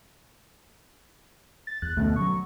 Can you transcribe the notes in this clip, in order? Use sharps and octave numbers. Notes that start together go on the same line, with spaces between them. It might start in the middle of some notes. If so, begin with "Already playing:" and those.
A6
E2 F#6
D2 B2 A3 C#4
B2 F#3 C#6